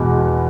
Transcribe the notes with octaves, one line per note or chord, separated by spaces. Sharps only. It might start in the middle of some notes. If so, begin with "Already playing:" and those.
Already playing: E2 B2 G#3 B3